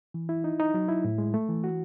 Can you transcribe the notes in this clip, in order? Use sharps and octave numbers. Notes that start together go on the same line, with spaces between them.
E3
E4
D#4
D#4
F#3
E4
A2
G#3
A3
E3
F#4